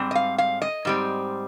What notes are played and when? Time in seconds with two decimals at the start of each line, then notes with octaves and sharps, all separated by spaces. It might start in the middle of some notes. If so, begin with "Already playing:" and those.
Already playing: G#2 G3 C4
0.11 D#5
0.15 F5
0.38 F5
0.62 D#5
0.85 G#2 G3 C4